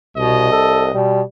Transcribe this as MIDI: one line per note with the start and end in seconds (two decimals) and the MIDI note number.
0.17 0.94 36
0.17 0.49 47
0.17 1.00 75
0.52 0.85 69
0.95 1.22 47
0.95 1.21 55